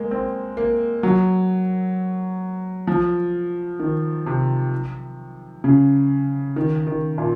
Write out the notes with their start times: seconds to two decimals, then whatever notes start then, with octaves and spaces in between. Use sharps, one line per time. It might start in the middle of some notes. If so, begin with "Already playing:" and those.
Already playing: G#3 A#3
0.11 C4
0.57 A#3
1.03 F#3
2.87 F3
3.80 D#3
4.26 C3
5.64 C#3
6.56 D#3
6.87 D#3
7.18 A#2